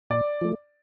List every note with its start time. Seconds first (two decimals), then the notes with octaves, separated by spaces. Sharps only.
0.10 A#2 D5
0.41 F3 A3